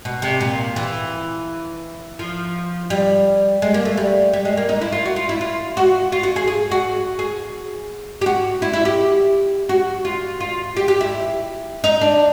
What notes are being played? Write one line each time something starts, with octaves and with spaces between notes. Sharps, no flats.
B2
C3
A#2
E3
F3
G3
G#3
A#3
A3
G3
G3
G#3
A#3
D#4
E4
F4
F#4
F4
E4
F4
F#4
F4
F#4
G#4
G#4
F#4
G#4
G4
F#4
E4
E4
G4
F#4
F4
F4
G4
G4
E4
D#4
D4